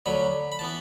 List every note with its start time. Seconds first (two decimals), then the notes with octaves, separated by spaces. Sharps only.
0.06 D2 D3 F#3 B5
0.52 B5
0.59 E3 B3 A5